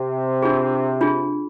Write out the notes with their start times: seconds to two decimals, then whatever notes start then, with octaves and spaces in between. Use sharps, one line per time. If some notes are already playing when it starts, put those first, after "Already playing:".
Already playing: C3
0.43 D4 F4 G#4
1.01 D4 F4 G#4